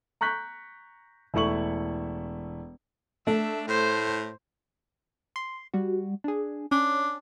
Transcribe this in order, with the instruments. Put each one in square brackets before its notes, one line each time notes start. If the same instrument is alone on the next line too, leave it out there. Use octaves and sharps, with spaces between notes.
[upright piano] A#5 C#6 F#6 G6 B6
E1 A3 E4 C#6 F#7
[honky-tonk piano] A3 [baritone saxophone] D4 [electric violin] E5
[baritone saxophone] A2 [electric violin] C5
[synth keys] C6
G3 F#4
D4 G#4
[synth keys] C#4 [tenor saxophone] D4